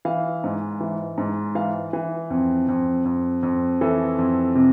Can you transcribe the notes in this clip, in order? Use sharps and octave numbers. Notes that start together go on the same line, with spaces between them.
E3 F5
G#2
E3
G#2
E3 F5
E3
F2
F2
F2
F2
E3 A4
F2
C3